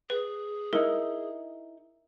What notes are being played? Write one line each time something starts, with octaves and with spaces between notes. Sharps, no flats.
G#4 B4
D#4 E4 A#4